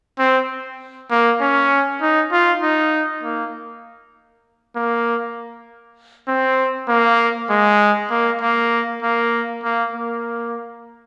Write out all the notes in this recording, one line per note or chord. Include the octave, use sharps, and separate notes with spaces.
C4
A#3
C#4
D#4
F4
D#4
A#3
A#3
C4
A#3
G#3
A#3
A#3
A#3
A#3
A#3